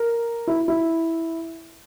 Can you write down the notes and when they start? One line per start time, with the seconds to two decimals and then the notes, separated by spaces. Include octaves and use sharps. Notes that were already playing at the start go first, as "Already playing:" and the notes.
Already playing: A#4
0.47 E4
0.68 E4